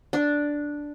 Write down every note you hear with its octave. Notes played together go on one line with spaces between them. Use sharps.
D4